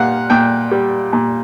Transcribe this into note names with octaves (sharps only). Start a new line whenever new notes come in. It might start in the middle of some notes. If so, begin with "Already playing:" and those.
Already playing: A#2 G3 F5 F#5
A#2 G5
G3
A#2